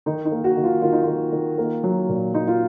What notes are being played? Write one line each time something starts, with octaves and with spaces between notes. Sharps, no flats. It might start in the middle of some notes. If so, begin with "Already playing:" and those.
D#3 D#4
D#4
A#3
F#4
D#3
F4
D#3 F4
D#4
F4
D#3
D#3
A#3
F#3
A#2
F#3 D#4
F4